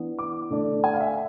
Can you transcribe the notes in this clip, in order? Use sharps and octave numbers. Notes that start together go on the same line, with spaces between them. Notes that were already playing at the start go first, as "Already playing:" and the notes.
Already playing: E3 B3 D4
D6
D3 A3 D4
G#5
F5
E5